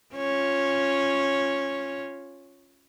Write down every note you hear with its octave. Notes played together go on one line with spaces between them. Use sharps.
C#4 F4 C#5